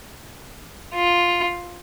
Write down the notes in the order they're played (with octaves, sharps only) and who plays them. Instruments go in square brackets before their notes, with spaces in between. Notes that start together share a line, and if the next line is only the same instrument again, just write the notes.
[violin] F4